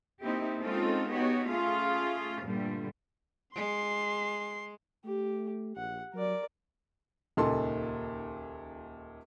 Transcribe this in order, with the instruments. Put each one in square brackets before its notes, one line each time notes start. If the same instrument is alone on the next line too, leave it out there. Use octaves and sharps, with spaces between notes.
[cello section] A#3 C4 D#4 E4 G4
G#3 C4 C#4 D#4 F4 A4
B3 D#4 F#4 G4 C#5
A3 C#4 F4 G#4 F5
G2 A#2 D3 G3 A3
[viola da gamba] G#3 [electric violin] C6 C7
[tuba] A3 [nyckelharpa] G4
[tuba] A#1 [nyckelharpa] F#5
[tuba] F#3 [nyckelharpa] A#4 D5
[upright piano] D#1 C#2 A#2 D#4 A4 C6